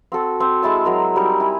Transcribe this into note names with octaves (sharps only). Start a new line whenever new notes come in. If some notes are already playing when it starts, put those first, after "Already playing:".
C4 F#4 A4
C4
G#3 E4 A5 E6
F#3 G#3 A#4
G3 C4 D#4
E4 G#5